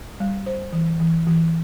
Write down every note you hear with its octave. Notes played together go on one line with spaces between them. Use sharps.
G3
C5
E3
E3
E3